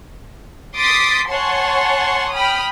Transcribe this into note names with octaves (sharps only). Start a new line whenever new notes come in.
C6 D6 D#6 A6 B6 C7
C#5 F#5 G#5 A5 C6 C#6
G5 B5 D#6 F6